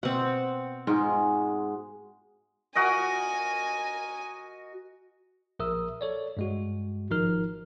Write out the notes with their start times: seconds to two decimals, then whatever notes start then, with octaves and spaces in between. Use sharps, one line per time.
0.03 B2 C4 F#5
0.87 G#2 G#3 D#4 F4 F#4 G#4
2.75 F#4 A#4 D#5 G#5
5.59 A#1 A#4 E5 D#6 E6
6.01 A4 C#5 D5
6.37 G2 G#3 F#4
7.10 G#1 F3 D#4 A#4 F6